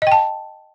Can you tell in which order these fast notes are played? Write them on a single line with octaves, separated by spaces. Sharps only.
D#5 G5 A5